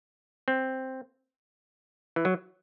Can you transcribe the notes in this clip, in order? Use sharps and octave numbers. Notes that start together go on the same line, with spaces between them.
C4
E3
F#3